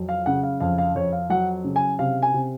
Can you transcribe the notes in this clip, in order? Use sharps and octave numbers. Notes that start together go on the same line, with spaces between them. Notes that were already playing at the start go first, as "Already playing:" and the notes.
Already playing: F2 F#3
F5
C#3 F#5
F5
F2 F5
F5
F2 C#5
F5
F#3 F#5
C#3
G#5
C3 F5
G#5
C3